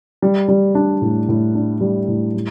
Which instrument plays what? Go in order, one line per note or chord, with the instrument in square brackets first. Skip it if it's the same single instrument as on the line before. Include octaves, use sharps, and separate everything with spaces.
[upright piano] G3
G3
D4
A2
A2
D4
G3
A2
G3